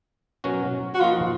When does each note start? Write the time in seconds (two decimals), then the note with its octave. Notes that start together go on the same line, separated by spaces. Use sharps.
0.44 B2 F#3 C#4 F#4 A#4
0.94 F#4
1.00 F3 A#3 D#4 F4 A#4